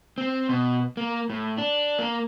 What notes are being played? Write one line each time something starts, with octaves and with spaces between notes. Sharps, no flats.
C4
B2
A#3
A2
D4
A#3